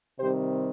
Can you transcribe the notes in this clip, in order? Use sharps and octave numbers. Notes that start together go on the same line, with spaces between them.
C3 D#3 G3 C4 G4 C5